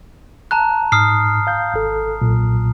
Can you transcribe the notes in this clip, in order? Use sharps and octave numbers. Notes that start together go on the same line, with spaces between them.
A5 A#5 F#6
G#2 D#6 F6 C7
F5 G6
G#1 A4
B1 A#2